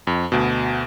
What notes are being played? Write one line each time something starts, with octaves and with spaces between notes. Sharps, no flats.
F2
D2 B2